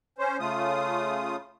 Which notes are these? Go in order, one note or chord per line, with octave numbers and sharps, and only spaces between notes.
C#4 C5
C#3 A3 F4 D#6